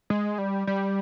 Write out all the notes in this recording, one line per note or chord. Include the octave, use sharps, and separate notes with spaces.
G#3
G3
G3